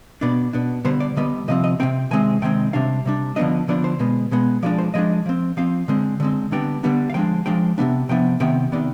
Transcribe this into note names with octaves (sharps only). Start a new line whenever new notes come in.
B2 B3 D4 D5
B2 B3 D4
D3 G3 B3 C5
D5
D3 G3 B3 D#5
C3 F3 C4 D#5
D#5
C3 F3 C4 G5
C3 D#3 G#3 C4 G#5
C3 D#3 G#3 C4 G5
C3 G3 D4 F5
C3 G3 D4
D3 F3 B3 D4 D#5
D3 F3 B3 D4 D5
C5
B2 G#3 B3
B2 G#3 B3
F3 G#3 D4 D5
C5
F3 G#3 D4 D#5
F3 C4
F3 C4 F5
D3 G#3 C4
D3 G#3 C4
D3 G3 B3 D4 G5
D3 G3 B3 D4
F5
F3 G#3 D4 G5
F3 G#3 D4 G5
C3 F3 B3 D4
C3 F3 B3 D4 G5
C3 D#3 B3 G5
C3 D#3 B3 D5